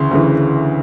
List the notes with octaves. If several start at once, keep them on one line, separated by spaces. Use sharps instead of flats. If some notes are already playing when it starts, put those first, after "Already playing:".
Already playing: D2 C#3 E3 C6
D2 C#3 E3